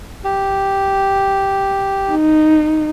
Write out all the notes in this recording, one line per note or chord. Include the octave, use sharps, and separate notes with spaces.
G4
D#4